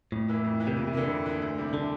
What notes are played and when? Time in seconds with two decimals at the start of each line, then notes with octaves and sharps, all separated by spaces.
0.12 F2 A2
0.28 E3 A#3 E4
0.44 F2
0.60 E3 A#3 E4
0.67 C3
0.77 F2 A#2
0.87 C3
0.93 D3 E3 A#3 E4
1.09 F2
1.26 E3 A#3 E4
1.42 D2
1.58 C3 G3 A#3 E4
1.74 D3